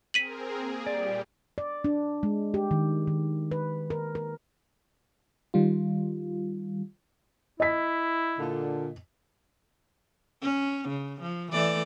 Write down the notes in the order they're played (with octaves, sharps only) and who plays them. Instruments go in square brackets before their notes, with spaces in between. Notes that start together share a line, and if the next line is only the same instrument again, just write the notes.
[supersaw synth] C4 G#4 A#4 [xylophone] B6 D#7 F#7
[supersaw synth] A#3 G#4
[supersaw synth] A#2 G3 G4 [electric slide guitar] D5
[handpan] D5
D4
G#3
G4
D#3
D#3
B4
A#4
A#4
[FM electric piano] D#3 G3 F4
[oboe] E4 [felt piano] D#5 B6
[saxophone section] A#2 D3
[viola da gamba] C#4
C#3
F3
E3 A3 D5